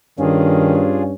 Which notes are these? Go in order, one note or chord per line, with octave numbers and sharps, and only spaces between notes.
G2 D#3 C#4 D4 F4 G#4